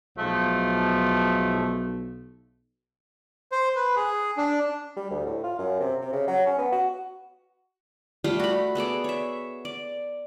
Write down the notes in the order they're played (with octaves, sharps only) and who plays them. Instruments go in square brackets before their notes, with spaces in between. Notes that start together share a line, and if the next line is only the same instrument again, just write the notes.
[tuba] B1 [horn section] F3 G#3 A3
[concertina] C5
B4
G#4
D4
[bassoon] G3
D2
A2
F4
F#2
C3
C3
C#3
F#3
C#4
B3
F#4
[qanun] G3 A3 F4 G4
F#4 B5
B3 G#4 A4 D5
C#5 E5
D5